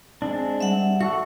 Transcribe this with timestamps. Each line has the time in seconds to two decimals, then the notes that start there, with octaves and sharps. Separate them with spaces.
0.22 G#3 C4 D4
0.60 G3 E5 F#5
1.01 F#4 A4 F#5 C#6